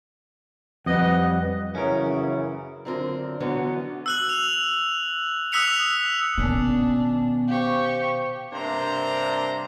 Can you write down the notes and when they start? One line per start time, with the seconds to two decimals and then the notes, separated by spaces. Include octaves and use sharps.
0.86 F2 G3 B4 D#5 F#5
1.75 F#2 C#3 E3 C#4 A#4
2.85 F#2 D3 C4 F4 F#4 A#4
3.40 D3 E3 F#3 G#3 B3 C#4
4.06 E6 F#6 F#7
4.29 F7
5.52 D#6 E6 F#6 B6 C#7 F7
6.38 B2 D#3 B3 C#4 D4 G#5
7.48 G4 C5 F5 C#6
8.53 G2 C3 A#3 D4 C5 A#5